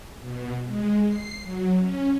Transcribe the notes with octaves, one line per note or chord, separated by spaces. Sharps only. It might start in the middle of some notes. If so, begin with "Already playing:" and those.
B2
G#3
C7
F#3
C#4